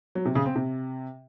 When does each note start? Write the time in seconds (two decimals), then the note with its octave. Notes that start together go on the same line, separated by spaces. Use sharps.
0.15 F#3
0.25 C3
0.35 C#3
0.45 C4
0.56 C3